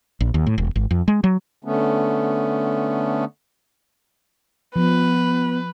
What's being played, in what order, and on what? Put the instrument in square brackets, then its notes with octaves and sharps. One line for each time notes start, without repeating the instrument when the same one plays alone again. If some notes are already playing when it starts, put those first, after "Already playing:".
[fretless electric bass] A#1
D#2
A2
E1
G#1
F2
G#3
F#3
[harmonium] D3 A3 B3 C#4
[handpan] F3 [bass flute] B3 [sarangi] B4